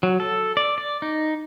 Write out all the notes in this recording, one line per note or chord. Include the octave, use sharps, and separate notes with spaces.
F#3
A4
D5
D5
D#4